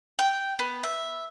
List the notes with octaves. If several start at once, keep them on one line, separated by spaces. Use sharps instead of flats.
G5
B3
E5